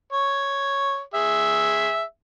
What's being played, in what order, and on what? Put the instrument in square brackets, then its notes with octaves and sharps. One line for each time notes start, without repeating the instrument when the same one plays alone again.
[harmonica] C#5
G#4 E5